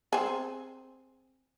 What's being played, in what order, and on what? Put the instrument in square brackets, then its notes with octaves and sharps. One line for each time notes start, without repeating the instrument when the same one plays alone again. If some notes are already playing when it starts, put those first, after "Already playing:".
[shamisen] C4 G#4